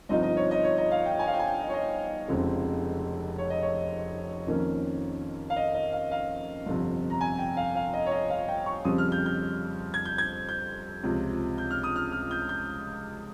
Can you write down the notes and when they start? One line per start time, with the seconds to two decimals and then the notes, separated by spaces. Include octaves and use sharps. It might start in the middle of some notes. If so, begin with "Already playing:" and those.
0.09 G1 G2 F3 C4 D#4 D#5
0.23 D#5
0.37 C#5
0.51 D#5
0.64 C#5
0.78 D#5
0.91 F5
1.06 G5
1.19 G#5
1.27 F5
1.33 G5
1.39 G#5
1.47 G5
1.60 D#5
1.69 C#5
1.73 D#5
2.28 F1 F2 C#3 G#3 C4
3.38 C#5
3.50 D#5
3.62 C#5
4.47 F2 D#3 A#3 C#4
5.50 F5
5.56 D#5
5.75 D#5
5.93 F5
6.11 F5
6.66 G1 F2 C3
7.10 A#5
7.21 G#5
7.39 G5
7.57 F5
7.75 F5
7.93 D#5
8.06 C#5
8.11 D#5
8.30 F5
8.48 G5
8.66 C#6
8.84 F2 C#3 G3 C4 D#6
8.98 F6
9.12 G6
9.26 G6
9.94 G#6
10.05 G6
10.18 G#6
10.49 G6
11.03 C#2 C3 F3
11.58 G6
11.71 F6
11.84 D#6
11.96 F6
12.12 F6
12.31 G6
12.49 G6